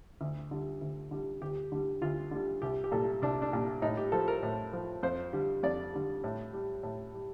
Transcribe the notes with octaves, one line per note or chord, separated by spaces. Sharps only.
D2
D3 G3
D2
D3 G3
D2 G4
D3 G3
D2 F4
D3 G3
C2 G4
G4
A#2 G3 A4
C2 D4
D4
A#2 G3
A2 D#4
G4
F3 A4
A#4
A2
F3
F2 C5
D3 G3
F2 D5
D3 G3
A2
G3
A2
G3